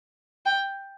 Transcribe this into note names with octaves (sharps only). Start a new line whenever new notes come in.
G5